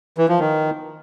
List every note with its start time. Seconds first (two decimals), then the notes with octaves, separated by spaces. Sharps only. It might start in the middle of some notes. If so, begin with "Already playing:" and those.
0.18 E3
0.29 F3
0.39 D#3